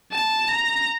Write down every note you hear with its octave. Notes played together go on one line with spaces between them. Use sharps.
A5
A#5